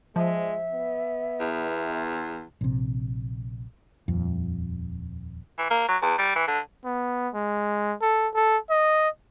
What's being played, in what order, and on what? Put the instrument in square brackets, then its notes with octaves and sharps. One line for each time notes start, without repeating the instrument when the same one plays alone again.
[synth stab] F3 [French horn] G#3 [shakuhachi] E5
[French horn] B3
[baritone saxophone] E2
[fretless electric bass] A#1 C3
D#1 F2
[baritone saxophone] E3
A#3
F#3
E2
G3
E3
D3
[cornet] B3
G#3
A4
A4
D#5